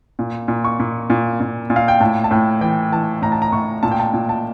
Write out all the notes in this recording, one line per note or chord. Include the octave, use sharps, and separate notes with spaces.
A#2
A#2
C#6
A#2
A#2
A#2
A#2
F5
G5
A2 A5
A5
A2 G5
E3 G5
E3 A5
A2 A#5
A5
A#5
A2 C#6
A#2 A5
G5
A5
A#2
A5